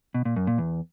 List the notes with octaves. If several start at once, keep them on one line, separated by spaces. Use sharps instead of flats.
B2
A#2
F#2
A#2
E2